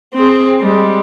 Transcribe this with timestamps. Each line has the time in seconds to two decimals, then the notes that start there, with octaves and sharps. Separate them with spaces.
0.14 C4 G#4
0.60 G3 G#3